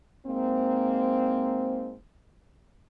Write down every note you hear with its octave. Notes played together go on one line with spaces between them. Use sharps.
G#2 A#3 C4